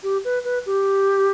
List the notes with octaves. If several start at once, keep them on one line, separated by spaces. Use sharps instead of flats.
G4
B4
B4
G4